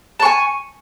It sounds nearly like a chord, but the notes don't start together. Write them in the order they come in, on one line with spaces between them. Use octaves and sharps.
A5 C#6 G#5